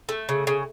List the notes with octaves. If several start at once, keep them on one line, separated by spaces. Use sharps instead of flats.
A3
C#3
C#3